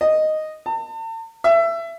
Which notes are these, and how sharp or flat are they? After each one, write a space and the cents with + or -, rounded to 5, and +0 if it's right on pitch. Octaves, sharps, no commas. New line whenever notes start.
D#5 -5
A5 +40
E5 +25